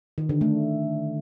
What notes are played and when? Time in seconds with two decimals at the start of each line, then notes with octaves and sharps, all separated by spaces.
0.18 D#3
0.29 D3
0.41 A3